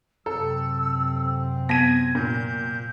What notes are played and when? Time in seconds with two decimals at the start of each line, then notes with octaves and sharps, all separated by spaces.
0.26 F#2 C3 C4 A4 E6
1.69 B3 G#6 A#6 B6 D#7
2.15 A#2 G6